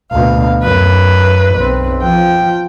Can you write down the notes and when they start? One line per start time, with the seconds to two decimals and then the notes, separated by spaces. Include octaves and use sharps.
0.12 D2 B2 F5
0.63 F#2 B4
1.56 B1 C4
2.02 F3 G5